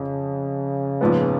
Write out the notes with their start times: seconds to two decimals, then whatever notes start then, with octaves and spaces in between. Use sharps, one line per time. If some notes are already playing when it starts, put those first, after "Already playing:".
Already playing: F2 C#3
1.01 A#1 G#2 F3 G#3 B3